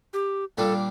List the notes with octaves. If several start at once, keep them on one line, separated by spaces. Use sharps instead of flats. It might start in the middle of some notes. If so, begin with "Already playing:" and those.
G4
A#2 G3 A#3 D4 F4 A4